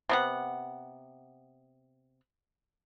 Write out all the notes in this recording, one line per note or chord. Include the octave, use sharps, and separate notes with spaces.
C3 B3 F#5